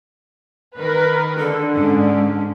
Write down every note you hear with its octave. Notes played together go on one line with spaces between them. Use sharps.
D#3 A#4 B4
D3 A4
G#2 G#3 C#4